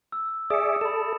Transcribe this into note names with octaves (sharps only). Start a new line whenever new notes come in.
E6
G#4 D5 E5 D#6 C#7
A4 B5 E7